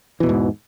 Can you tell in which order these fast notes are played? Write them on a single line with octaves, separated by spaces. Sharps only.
E3 B2 E2 G#2